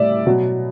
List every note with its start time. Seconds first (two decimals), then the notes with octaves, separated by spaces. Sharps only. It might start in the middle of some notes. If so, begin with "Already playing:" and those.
Already playing: A2 G3 D5 E5
0.26 B2 F#3